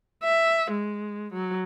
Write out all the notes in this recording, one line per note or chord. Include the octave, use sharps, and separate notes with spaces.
E5
G#3
F#3